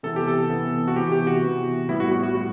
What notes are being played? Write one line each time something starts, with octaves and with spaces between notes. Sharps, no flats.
C3 E3 B3 A4
G4
A4
C3 E3 B3
F#4
C3 E3 B3 G4
G4
F#4
C3 E3 B3
A2 G3 B3 E4
F#4
F#4
F#4
A2 G3 F#4